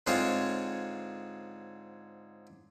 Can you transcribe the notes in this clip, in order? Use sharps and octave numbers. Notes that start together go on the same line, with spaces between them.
G#2 D3 G#3 C4 F4 C#5